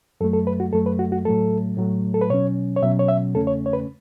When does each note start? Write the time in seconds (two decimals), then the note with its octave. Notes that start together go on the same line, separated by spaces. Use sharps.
0.21 F#2 F#3 A3 A4
0.33 A4
0.47 B4
0.60 F#4
0.73 F#2 F#3 A3 A4
0.86 B4
0.99 F#4
1.12 F#4
1.25 A2 F#3 A3 A4
1.77 A2 F#3 A3
2.14 A4
2.21 B4
2.30 B2 F#3 C#4 C#5
2.76 C#5
2.82 B2 F#3 C#4 E5
2.99 C#5
3.08 E5
3.34 E2 C#3 A3 C#4 A4
3.47 C#5
3.66 C#5
3.73 B4